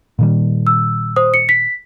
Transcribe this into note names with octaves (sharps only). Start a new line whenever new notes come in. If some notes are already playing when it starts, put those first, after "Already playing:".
A#2 D#3 G3
E6
C5 D#6
C#7
B6